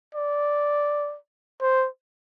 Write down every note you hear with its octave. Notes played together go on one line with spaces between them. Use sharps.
D5
C5